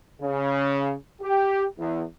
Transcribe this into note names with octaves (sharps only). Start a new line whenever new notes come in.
C#3
G4
E2